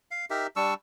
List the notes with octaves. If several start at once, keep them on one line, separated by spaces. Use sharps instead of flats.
F5
D#4 G4 A#4 E5
G3 D4 C#6 E6